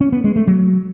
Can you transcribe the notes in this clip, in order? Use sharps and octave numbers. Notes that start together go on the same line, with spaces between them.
C#4
B3
G#3
A3
F#3